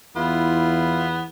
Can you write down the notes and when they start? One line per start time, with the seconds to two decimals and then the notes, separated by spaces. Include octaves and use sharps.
0.16 E2 B3 E4 F4 C6